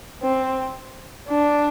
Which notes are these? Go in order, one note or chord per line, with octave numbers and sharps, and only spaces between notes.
C4
D4